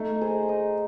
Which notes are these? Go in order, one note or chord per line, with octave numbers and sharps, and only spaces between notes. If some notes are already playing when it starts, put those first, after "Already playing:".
Already playing: A3 D#4
G#4 C5 D#5
D#4